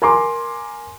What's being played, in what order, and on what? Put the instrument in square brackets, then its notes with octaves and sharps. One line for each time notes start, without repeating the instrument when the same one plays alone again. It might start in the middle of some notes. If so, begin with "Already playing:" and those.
[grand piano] A#4 G#5 A#5 C6 D6